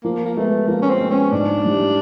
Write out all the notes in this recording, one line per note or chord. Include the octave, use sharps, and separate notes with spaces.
F3 A#3
A#3
G#3 A3 B3
F3 A#3
C#4
C4
G#3 B3
C#4
G#2 D4
E3 G3